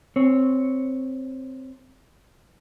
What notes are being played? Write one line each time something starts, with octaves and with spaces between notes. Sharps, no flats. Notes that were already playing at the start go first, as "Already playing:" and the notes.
C4 C#5